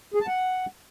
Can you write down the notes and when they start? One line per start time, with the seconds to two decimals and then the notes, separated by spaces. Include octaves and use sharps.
0.14 G#4
0.21 A5
0.27 F#5